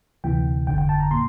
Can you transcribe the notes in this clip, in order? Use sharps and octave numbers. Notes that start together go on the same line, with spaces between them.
D2 C3 E3 G5
G1 F2 D3 G5
G5
A5
A#5
A#2 C6